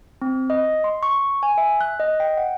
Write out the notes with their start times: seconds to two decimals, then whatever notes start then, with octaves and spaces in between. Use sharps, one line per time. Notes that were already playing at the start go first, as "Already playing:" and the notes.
0.22 C4
0.50 D#5
0.84 C6
1.03 C#6
1.43 G#5
1.58 E5
1.81 F#6
2.00 D#5
2.20 G5
2.37 F#5